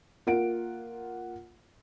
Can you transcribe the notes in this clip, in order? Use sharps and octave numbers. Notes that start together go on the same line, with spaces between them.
A#3 F4 F#5 D7